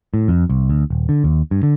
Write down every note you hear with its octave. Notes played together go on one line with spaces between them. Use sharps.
A2
F2
C2
D2
D#1
D3
D#2
G2
D3